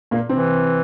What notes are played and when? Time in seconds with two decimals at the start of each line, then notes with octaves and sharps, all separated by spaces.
0.11 A#2 A#3
0.29 C3 E3 C4